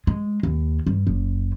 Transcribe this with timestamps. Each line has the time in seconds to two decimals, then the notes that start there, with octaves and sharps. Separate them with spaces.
0.07 G#3
0.43 D#2
0.86 G2
1.07 F#1